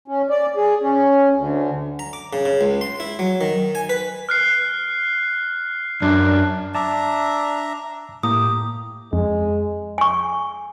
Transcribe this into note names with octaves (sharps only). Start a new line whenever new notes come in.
C#4
D5
G#4
C#4
D2
A#5
D6
C#3
C#3
C#2
C6
E4
F#3
D#3
G#5
B4
F6 F#6 C7
F#2 D4 F#6
D4 E5 A5 A#5 D6
A2 A#3 G4 A#5 D#6
F2 G#3
G#5 C#6